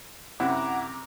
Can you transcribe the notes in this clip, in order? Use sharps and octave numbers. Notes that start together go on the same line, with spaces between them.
F#2 C3 E4 F#5 A#5 D6